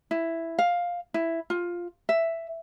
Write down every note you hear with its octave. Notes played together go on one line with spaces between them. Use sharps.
E4
F5
E4
F4
E5